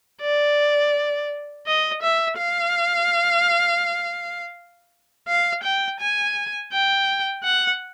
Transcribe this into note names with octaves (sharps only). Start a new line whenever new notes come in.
D5
D#5
E5
F5
F5
G5
G#5
G5
F#5